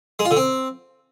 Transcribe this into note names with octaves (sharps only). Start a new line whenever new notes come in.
G#3
F4
D3
C4